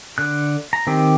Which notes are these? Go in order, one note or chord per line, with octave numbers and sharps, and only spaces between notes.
D3 F#6
A#5
D#3 C4 G4